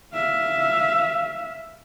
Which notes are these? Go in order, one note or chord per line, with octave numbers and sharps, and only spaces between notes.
E5 F5